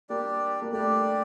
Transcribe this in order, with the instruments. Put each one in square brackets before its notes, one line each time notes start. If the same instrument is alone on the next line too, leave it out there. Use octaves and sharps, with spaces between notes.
[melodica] G3 D4 G4 D5 [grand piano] A#3
[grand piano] A#3
[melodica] G3 D4 G4 D5 [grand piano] A3